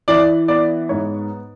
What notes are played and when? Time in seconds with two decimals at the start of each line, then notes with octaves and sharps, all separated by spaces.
0.08 E3 D5
0.48 B3 D5
0.89 G#2 C#5